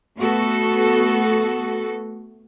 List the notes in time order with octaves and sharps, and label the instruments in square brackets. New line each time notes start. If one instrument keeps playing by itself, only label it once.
[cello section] A3 B3 F#4 A4